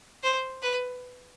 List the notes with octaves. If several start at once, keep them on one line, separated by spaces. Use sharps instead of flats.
C5
B4